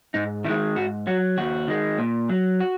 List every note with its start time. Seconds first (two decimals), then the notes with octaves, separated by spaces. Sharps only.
0.14 G#2 D#4
0.45 D#3 E4
0.50 G#3
0.76 G#2 F#4
1.07 F#3 F#4
1.37 D#2 F#4
1.68 D#3 G#3
1.98 A#2
2.29 F#3
2.61 F#4